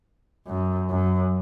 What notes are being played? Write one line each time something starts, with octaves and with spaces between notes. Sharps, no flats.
F#2
F#2